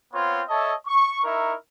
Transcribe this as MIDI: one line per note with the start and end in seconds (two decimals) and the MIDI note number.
0.12 0.41 59
0.12 0.41 60
0.12 0.41 65
0.12 0.41 73
0.49 0.73 69
0.49 0.73 73
0.49 0.73 75
0.49 0.73 76
0.49 0.73 81
0.86 1.20 85
1.23 1.54 63
1.23 1.54 64
1.23 1.54 70
1.23 1.54 76
1.23 1.54 85